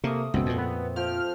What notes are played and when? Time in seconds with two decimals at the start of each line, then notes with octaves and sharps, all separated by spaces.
0.04 C3 A3 A#3 D#6
0.34 C#2 F#2 B2 C4
0.46 F2 A#2
0.58 B3
0.96 F3 G5 F6